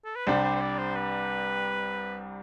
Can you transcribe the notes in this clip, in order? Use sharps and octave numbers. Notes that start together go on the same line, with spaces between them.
A4
B4
C2 C3 G3 D4 G4 C5
C5
C5
D5
C5
B4